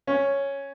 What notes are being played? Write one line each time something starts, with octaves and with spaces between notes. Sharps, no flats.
C#4